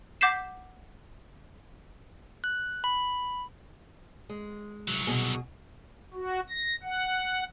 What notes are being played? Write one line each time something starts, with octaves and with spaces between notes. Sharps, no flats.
F#5 D6 G6 B6 C7 E7
F#6
B5
G#3
C2 F#3
B2 G#4
F#4
A#6
F#5